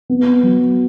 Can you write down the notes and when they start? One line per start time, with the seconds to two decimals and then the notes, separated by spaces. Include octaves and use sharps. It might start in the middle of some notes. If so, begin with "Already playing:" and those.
0.10 B3
0.43 F#3